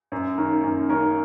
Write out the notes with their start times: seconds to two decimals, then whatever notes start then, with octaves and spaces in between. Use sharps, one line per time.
0.12 F#2
0.37 D#3 A#3 C#4 A#4
0.63 F#2
0.89 D#3 A#3 C#4 A#4